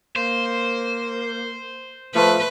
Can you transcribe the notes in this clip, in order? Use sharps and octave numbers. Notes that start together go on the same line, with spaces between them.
A#3 C5
F3 A3 B4